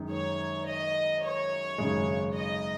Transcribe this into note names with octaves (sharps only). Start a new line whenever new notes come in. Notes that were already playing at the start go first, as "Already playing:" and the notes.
Already playing: F#2 D#3 G#3 D#4
C#5
D#5
C#5
G#1 F#2 C#3 G#3
D#5